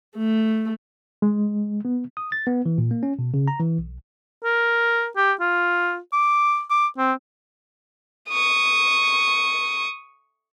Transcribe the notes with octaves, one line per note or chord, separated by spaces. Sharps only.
A3
G#3
B3
D#6
A6
B3
E3
A#2
A#3
C#4
B2
C#3
A#5
E3
B1
A#4
G4
F4
D6
D6
C4
C#6 D#6